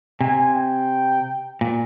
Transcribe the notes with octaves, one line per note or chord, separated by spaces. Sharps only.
C3 G#5
G5
A#2